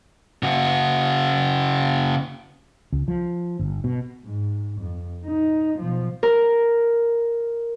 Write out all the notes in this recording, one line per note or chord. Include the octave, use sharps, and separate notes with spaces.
C#3 F#4
C#2
F3
G1
B2
G#2
F2
D#4
B2 F3
A#4